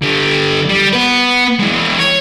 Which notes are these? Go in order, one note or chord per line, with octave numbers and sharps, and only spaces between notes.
D3 G3
G3
B3 B4
E3 G#3
C#5